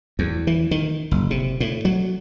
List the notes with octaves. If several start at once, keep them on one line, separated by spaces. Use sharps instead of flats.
E2
E3
D#3
F#1
C3
A2
F#3